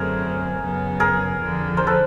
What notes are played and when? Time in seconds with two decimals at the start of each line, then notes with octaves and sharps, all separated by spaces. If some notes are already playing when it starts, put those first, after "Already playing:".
Already playing: F#2 D3 F#3 A3 C4 G#4 A#4
0.61 F#2 C#3 F#3 B3
1.00 G#4 A#4
1.39 F2 D3 F3
1.77 A#4 C5
1.87 A4 B4